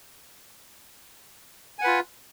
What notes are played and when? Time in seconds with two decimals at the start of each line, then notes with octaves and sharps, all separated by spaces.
1.79 G#5
1.81 F#5
1.84 B4
1.87 F4